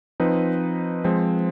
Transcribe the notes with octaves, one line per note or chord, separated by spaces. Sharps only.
F3 C4 D#4 B4
F3 G#3 C4